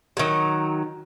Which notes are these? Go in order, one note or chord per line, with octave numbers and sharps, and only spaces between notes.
D#3 F#3